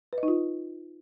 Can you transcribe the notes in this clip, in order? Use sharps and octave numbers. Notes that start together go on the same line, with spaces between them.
B4
D#5
D#4
F4